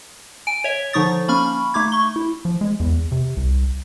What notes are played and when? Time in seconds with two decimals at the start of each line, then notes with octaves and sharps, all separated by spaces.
0.47 G#5 D7
0.64 C#5 E5
0.93 D3 F3 D#4 C#6 D#6 A6
1.28 A#3 C#4 B5 C#6 F6
1.74 A3 D#4 D6 G#6
1.92 C#6 G7
2.16 E4
2.45 F3
2.61 G#3
2.80 E2
3.12 C3
3.37 C2